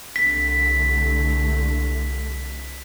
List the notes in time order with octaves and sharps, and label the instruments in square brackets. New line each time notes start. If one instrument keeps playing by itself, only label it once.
[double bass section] C2 D3 A3 [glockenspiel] B6